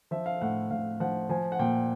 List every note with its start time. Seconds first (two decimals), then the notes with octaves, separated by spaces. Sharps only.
0.11 F3 E5
0.26 F5
0.41 A2 F#5
0.71 A2 F5
1.00 F3 F#5
1.29 F3 G#5
1.52 F#5
1.59 A#2 G5